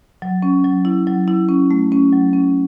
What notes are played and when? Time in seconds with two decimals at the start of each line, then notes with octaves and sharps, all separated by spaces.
0.22 F#3
0.43 C#4
0.64 F#3
0.85 E4
1.07 F#3
1.28 E4
1.49 C#4
1.71 A3
1.92 C#4
2.13 F#3
2.33 C#4